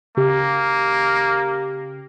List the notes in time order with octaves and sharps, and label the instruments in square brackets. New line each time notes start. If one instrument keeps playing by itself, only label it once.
[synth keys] C#3 G4 [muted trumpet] A#3